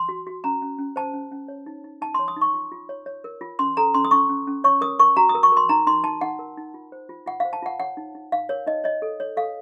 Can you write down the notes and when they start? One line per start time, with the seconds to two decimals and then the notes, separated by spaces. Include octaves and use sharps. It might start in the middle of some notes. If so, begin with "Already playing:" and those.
Already playing: C6
0.09 F#4
0.27 F#4
0.44 C#4 A#5
0.62 C#4
0.78 C#4
0.96 C5 A5
1.14 C#4
1.32 C#4
1.48 C#5
1.66 D#4
1.84 D#4
2.02 D#4 A5
2.14 C#5 C6
2.28 D#6
2.36 D#4 C#6
2.54 F4
2.72 F4
2.89 C#5
3.06 C#5
3.24 A#4
3.41 F4
3.59 C#4 C6
3.77 A4 A#5
3.94 C#4 C6
4.05 D#6
4.11 C#4 C#6
4.29 C#4
4.47 C#4
4.64 C#5 C#6
4.81 A#4 D#6
4.99 A#4 C#6
5.17 F#4 A#5
5.29 D#6
5.35 A#4
5.43 C#6
5.52 A#4 C6
5.69 D#4 A#5
5.87 D#4 C6
6.04 D#4 A5
6.21 D#4 F#5
6.39 A#4
6.57 D#4
6.74 F4
6.92 C5
7.09 F4
7.26 F4 F#5
7.40 C5 F5
7.53 A5
7.62 F4 F#5
7.79 C#5 F#5
7.97 D#4
8.15 D#4
8.32 D#4 F5
8.49 A#4 C#5
8.66 D#4 D#5
8.84 C#5 D#5
9.02 A4
9.20 C#5
9.37 A4 F5